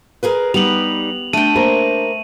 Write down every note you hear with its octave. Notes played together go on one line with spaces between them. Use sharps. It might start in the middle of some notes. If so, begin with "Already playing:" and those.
G#4 A#4 B4
G3 B3 D#4 G4 F7 F#7
A3 D4 G5 D#7
A#3 A#4 C5